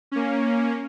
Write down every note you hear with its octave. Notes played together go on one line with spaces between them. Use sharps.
A#3 C#4